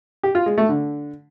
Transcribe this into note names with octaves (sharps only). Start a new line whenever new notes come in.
G4
F4
G#3
A3
D3